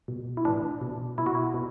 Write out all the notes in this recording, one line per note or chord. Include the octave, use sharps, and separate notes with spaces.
B2
E4
A2 E3 D4
B2
B2 E4
F#4
E4
B2